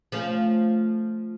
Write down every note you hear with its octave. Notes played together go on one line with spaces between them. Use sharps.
F3 A3 C#4